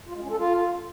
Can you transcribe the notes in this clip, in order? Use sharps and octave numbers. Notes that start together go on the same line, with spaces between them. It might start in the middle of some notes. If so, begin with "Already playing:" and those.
F4
G#3
C#4
A4
F4